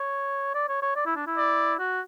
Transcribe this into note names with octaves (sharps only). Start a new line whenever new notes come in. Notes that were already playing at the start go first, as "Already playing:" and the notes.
Already playing: C#5
D5
C#5
C#5
D5
E4
D4
E4
D5
F#4